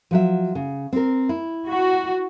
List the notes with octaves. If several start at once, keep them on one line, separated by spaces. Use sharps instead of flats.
F3 F#3 E5
C#3
C4 A#4
E4
F#4